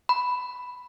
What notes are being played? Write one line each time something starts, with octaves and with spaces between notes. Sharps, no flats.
B5